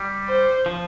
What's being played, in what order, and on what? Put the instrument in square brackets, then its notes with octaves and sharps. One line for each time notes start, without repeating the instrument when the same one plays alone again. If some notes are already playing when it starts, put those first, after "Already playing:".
Already playing: [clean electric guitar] G3
[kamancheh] C5
[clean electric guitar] F3